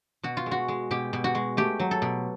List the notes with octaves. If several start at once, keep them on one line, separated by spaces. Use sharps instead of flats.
B2 F#4
F4
G#3
F#4
G#3
B2 G4
B2
F#4
G#3
A3 G4
F#3
A4
B2